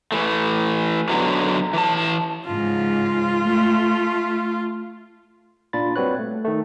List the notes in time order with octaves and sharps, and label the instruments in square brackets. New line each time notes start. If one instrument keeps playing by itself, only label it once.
[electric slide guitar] E3 A3
B2 D3 F#3
E3 A5
[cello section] G#2 C#3 F3 [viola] F4
[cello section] A3
[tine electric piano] A#2 D4 F4 B5 A6
G3 C4 F#4 B4 C#5 F#6
A3
D#3 A3